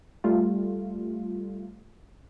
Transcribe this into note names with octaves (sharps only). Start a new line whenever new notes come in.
G3 A3 F4